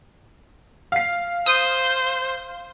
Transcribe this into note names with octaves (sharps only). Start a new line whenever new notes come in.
F5 C7
C5 D#6